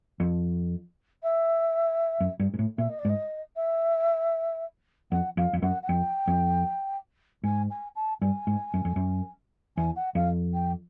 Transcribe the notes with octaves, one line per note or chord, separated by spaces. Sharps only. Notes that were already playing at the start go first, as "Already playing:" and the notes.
F2
E5
F#2
G2
G#2
A2
A#2 E5
D#5
D5
G#2
D#5
E5
F2 F#5
F2 F5
F2
F#2 F#5
F#5
F2 G5
F2
G#2 G#5
G#5
A5
G2 G#5
G#2
F#2
F2
F#2
E2 G#5
F#5
F2 F5
G5